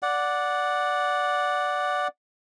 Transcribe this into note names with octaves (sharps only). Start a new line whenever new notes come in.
D5 F#5